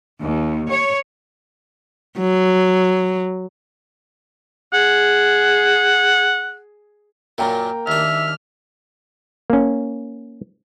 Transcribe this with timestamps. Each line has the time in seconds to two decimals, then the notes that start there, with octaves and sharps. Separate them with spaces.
0.18 D#2
0.68 C#5
2.18 F#3
4.73 G#4 F#5
7.38 F#2 A#2 F#3 A#3 G5 A#5
7.87 D#2 D4 E5 F6
9.50 A#3 C#4